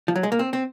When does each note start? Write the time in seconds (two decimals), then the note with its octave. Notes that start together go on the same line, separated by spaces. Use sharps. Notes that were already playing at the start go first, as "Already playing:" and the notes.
0.08 F3
0.16 F#3
0.23 G#3
0.32 A#3
0.39 C4
0.53 C4